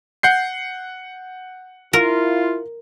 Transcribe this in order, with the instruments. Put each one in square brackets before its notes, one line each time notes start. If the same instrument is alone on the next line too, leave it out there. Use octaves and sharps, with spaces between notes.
[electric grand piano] F#5 G6 C7
[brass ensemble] E4 F4 [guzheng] A#4